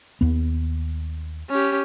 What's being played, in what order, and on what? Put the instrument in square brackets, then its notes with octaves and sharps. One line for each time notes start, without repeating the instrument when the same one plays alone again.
[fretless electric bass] D#2 B3
[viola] C#4 G4